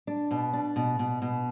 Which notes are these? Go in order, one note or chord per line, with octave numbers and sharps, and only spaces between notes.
D4
B2
D4
B2
B2
B2